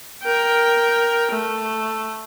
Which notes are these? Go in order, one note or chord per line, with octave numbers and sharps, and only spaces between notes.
A#4 G5
A3